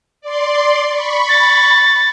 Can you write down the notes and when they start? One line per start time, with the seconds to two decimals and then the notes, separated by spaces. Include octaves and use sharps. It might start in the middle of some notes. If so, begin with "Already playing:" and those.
0.21 D5 C6
0.90 B5 C#6
1.29 A6